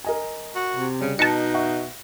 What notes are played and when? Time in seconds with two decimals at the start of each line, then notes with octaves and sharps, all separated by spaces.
0.04 A#4 D#5 G#5
0.55 F#4
0.76 C3
1.01 C#3 G3
1.19 B2 D#4 A5 A#6 C#7
1.54 E5 F#5 C#6